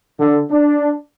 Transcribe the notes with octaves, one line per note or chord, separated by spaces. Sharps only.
D3
D4